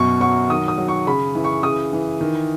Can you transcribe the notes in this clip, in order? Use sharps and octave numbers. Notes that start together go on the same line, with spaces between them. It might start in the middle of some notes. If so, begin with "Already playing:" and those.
Already playing: F#2 B2 C#6
F#3 C#6
D#3 D#6
D#6
F#3
C#6
C#3 B5
E3
C#6
C#3 D#6
E3
D#3